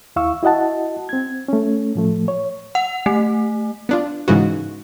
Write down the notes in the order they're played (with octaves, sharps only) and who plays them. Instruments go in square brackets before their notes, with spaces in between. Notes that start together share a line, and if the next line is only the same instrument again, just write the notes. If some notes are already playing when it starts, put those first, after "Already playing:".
[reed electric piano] D#2 E4 F5 C#6 E6
E4 F#4 D#5 F#5 A5
C4 G#6
A3 C#4
A2 F3 A3
C#5
[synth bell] F#5
A3
[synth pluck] B3 D4 F4
G#2 C#3 E3 B3 F#4